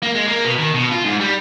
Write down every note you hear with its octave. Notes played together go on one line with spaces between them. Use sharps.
A#3
G#3
A#3
B2
D#3
B2
F4
G#2
G3